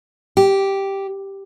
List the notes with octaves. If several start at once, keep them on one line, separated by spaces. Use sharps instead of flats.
G4